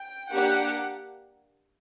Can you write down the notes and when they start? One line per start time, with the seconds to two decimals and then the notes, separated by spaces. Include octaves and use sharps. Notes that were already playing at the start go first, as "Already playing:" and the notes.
Already playing: G5
0.30 A#3 D4 G4 F#5